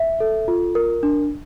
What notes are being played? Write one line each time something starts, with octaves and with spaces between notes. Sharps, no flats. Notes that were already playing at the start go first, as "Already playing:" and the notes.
Already playing: E5
A4
F4
A#4
D4